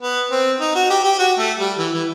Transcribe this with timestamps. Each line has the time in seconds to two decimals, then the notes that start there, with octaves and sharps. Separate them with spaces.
0.02 B3
0.31 C4
0.60 D#4
0.76 F#4
0.90 G4
1.04 G4
1.19 F#4
1.38 A3
1.59 G3
1.79 E3
1.93 E3